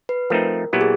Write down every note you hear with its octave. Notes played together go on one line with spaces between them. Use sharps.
B4
F3 A3 C4 D#4 A#4
A#2 F#3 B3 E4 G4
G#4